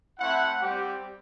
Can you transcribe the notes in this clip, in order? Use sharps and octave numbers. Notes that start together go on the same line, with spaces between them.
A3 C4 E4 F#5
G3 C4 G4